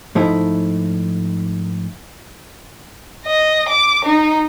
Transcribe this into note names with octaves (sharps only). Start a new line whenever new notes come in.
G#2 F3 A3 D#4 E4
D#5
D6
D#4